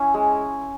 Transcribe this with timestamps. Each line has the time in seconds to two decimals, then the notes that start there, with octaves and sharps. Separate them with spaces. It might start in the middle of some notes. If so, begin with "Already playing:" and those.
Already playing: C#4 E4
0.14 G#3